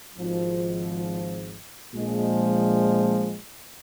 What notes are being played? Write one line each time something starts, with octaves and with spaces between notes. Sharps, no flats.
G#1 G#2 F3
A#1 A#2 F3 G#3